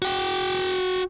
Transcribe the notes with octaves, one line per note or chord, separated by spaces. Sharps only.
F#4 G5